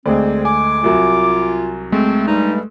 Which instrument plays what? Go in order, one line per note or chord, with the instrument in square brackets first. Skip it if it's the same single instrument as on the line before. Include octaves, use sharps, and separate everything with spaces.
[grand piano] D2 G#3 [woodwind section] C4 [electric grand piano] G#4 D5
[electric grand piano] G#5 [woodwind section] D6
[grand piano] C2 F#3 [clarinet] F4
[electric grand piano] G#3 A3 A4 [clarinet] C4
[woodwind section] G2 G3 [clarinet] D#4